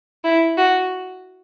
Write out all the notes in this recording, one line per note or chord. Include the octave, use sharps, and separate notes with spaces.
E4
F#4